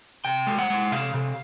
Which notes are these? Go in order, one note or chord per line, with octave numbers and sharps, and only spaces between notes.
C3 G5
G#3
F#5
G#3
C3 F5
C3